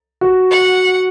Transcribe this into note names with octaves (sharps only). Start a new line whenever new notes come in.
F#4
F#5